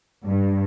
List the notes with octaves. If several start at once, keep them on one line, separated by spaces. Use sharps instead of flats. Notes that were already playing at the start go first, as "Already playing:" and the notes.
G2